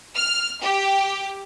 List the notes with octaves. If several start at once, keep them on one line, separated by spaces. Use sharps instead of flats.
F6
G4